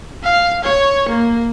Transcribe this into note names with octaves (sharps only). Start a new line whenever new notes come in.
F5
C#5
A#3